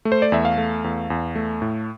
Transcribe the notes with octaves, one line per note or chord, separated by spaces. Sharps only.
A3
C5
D5
E2 E5
F5
A3
E2
E2
A3
A2